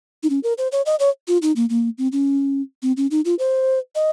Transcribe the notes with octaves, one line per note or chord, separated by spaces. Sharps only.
D#4
C#4
A#4
C5
C#5
D#5
C#5
F4
D#4
A#3
A#3
C4
C#4
C4
C#4
D#4
F4
C5
D#5